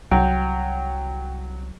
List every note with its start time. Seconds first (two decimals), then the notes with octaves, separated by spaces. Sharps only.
0.11 C2 F#3 G5